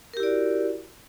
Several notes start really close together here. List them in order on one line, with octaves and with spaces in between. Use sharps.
A#4 G4 E4 D5 F#4